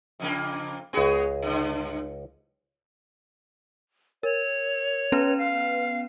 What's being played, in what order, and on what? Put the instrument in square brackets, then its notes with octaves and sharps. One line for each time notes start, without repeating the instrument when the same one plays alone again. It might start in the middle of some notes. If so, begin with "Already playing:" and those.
[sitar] F2 C#3 A#3
[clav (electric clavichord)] C#2 G#5 [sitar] B3 F#4 G#4
[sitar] G2 D3
[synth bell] A#4 [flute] C#5
[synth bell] B3 C#4 B4
[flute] F5